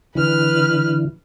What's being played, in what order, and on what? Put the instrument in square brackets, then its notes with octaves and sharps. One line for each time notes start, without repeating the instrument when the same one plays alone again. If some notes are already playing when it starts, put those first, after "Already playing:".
[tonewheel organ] D3 E3 [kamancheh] B4 F6